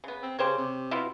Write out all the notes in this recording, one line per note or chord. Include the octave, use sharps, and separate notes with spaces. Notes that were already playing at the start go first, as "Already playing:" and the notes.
C#3 B3
C4
C#3 G4 C5 C#5
C3
B2 E4 F4